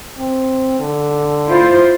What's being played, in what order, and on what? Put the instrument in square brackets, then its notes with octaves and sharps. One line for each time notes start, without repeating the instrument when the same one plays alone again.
[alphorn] C4
D3
[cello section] E4 F4 C5